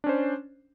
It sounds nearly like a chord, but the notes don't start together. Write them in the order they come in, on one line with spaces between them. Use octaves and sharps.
D4 C#4 C5